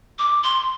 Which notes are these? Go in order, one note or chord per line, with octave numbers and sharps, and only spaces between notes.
D6
C6